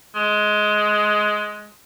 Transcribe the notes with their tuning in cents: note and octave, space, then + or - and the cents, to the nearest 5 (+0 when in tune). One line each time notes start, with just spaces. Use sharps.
G#3 +15